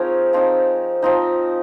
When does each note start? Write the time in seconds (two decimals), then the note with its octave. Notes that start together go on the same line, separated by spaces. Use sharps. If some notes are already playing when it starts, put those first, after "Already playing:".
Already playing: F3 C4 D#4 G#4 A#4 C#5
0.33 F3 C4 D#4
1.02 F3 C4 D#4